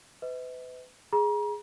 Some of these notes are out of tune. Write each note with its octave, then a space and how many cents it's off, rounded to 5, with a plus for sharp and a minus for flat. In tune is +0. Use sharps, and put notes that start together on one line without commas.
B4 +35 D#5 +45
G#4 +0 A#5 +35